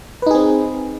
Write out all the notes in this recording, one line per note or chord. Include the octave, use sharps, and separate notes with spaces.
C4 D#4 G#4 B4